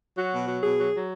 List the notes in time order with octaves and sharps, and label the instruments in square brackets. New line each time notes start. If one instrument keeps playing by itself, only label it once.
[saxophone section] F#3 F#4
B2
F#3
B2 G#4
F#3
F#3